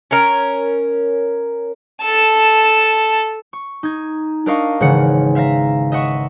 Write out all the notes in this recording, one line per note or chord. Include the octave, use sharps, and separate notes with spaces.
C#4 A#4
A4 A5
C#6
D#4 G#6
D4 D#4 A#4 D#5 F5 C#6
G#1 C#3 E3 F#5 C#7
E5 F5 A#5 A#6
D#5 E5 F#5 C#6